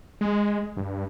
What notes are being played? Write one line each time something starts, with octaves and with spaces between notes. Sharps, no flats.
G#3
G2